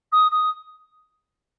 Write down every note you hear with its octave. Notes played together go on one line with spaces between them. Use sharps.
D#6
D#6